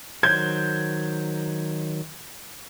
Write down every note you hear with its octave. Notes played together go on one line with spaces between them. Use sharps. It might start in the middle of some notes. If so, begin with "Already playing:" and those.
D#3 F#3 C5 G6 G#6